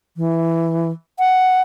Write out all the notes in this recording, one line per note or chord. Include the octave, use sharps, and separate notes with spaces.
E3
F#5